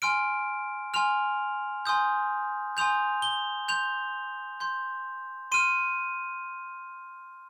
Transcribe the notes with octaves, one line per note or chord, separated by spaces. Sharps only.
G#5 C6 F6 D7
G#5 C6 F6 F7
G#5 C6 D#6 G6
G#5 C6 D#6 G6 F7
G7
C6 G6 F7
C6 G6
C6 F6 D#7